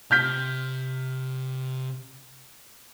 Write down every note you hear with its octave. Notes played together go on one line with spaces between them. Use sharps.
C3 F6 G6 B6